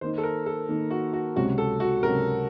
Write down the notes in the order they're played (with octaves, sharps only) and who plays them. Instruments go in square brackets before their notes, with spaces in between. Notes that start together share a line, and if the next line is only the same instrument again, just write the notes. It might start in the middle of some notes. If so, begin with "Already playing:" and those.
[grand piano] D#3 A#3 D#4 [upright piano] C5
[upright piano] A4
A#4
A4
[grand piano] D#3 A#3 D#4
[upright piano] F#4
F#4
[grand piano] C#2 C3 F#3 C4 [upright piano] F#4
[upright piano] A4
F#4
[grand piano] C#2 C3 F#3 C4 [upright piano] A#4